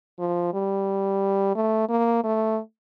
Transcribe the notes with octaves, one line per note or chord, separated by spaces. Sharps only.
F3
G3
A3
A#3
A3